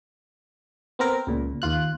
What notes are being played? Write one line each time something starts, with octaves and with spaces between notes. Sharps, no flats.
B3 C4 A#4
C#2 A#2
D#2 F4 F#6